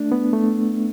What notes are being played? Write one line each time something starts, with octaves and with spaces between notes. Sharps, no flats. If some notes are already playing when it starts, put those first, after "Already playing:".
Already playing: A3 D4
B3
A3